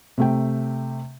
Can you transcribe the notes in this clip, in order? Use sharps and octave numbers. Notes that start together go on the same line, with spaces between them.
C3 A3 G5